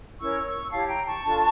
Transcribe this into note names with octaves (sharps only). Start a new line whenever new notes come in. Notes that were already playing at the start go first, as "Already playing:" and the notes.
C#4 E4 A#4 C#5 C#6 E6
C#6 E6
E4 G4 C#5 F5 A5
G5 A#5
A5 C#6
D4 F4 A4